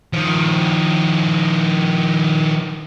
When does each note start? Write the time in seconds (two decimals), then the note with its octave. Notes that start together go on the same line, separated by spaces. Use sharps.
0.13 D#3 F3